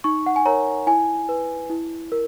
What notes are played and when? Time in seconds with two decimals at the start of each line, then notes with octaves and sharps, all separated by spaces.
0.04 D#4 C#6
0.26 F#5
0.36 G#5
0.45 A#4 C#5 A#5
0.87 E4 G#5
1.29 B4
1.70 E4
2.12 A#4